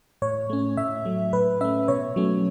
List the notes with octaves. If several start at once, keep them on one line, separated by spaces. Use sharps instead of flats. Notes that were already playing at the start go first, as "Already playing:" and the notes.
A2 C#5
A3 C#4
A2 E5
F#3 A3
A2 B4
A3 C#4 E5
B2 C#5
F#3 A3 C#4